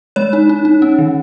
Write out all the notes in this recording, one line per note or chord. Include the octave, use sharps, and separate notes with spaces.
G#3 C#5
D#4
D#4
D#4
C#4
D#3